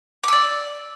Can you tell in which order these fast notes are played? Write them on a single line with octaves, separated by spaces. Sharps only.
D6 E6 D5